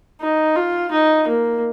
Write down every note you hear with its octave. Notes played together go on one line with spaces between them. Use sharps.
D#4
F4
D#4
A#3